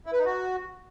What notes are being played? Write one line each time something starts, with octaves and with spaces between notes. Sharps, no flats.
E4
B4
D#4
F#4